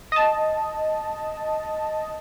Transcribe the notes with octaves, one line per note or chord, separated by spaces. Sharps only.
D#5 A5